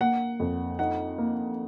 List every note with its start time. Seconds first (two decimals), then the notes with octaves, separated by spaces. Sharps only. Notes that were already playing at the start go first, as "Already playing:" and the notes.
0.01 A#3 F#5
0.40 F2
0.79 D#4 F#5
1.18 A#3